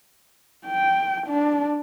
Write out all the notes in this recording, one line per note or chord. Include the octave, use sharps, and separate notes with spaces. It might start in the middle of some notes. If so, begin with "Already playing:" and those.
G5
D4